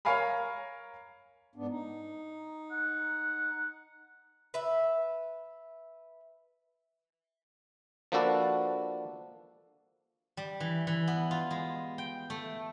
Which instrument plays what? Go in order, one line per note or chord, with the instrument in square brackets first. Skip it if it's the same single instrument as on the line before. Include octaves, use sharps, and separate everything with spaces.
[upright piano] A#4 C#5 F5 G#5 A#5 B5
[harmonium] G#2 B3 D4
D#4
[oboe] F#5
[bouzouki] B4 E5
[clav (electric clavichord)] F3 A#3 D4 F#4 A4 B4
[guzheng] G3
E3
E3
B3
F4
G#3
G5
A3